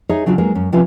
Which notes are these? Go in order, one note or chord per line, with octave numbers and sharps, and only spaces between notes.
D#4 G#4 C#5 D#5 E5
C#3 F#3 D4 F4 F#4
F#3 G#3 A#3 B3 D#4
F#2 C#4
C3 F3 C#4 F4 B4 E5